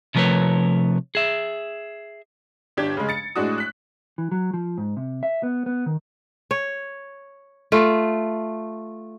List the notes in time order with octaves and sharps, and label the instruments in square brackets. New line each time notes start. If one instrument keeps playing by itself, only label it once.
[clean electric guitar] C3 F3 A3 A#4 B4 C#5
G#4 E5
[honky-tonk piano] G1 D4 G4 G#6
C#3 G#3
A6 C#7
A2 G#3 D4 F#4 D#6
F#6 B6
[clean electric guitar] E3
F#3
F3
G#2
C3
E5
B3
B3
D#3
[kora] C#5
A3 F4